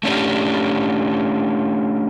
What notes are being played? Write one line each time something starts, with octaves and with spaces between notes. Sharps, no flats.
A3 C#4 D4 G4